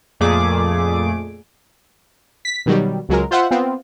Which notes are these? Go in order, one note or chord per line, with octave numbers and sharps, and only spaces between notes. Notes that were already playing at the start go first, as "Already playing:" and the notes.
F2 A#2 A3 G#4 D6
B6
B2 D#3 F#3 G3
C#2 F#3 G#3 A#4
F4 C5 E5 F#5
B3 C4 F4